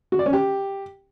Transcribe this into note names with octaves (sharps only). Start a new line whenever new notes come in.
F#4
D5
C#4
G4